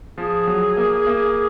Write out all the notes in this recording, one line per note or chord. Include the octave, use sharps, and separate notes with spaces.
F3 G#4
F#3
A#3
A#3